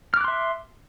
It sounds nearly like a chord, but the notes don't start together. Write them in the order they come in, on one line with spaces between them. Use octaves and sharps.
F6 D6 F#6 C6 E5